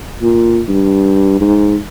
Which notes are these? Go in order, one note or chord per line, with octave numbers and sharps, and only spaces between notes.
A#2
G2
G#2